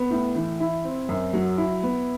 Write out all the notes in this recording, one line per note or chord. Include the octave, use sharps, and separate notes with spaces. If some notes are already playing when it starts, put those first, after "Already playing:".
Already playing: B3
A2
E3
E4
C4
F#2
F#3
E4
B3